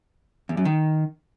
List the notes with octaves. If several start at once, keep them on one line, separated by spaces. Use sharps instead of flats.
E2
F#2
D#3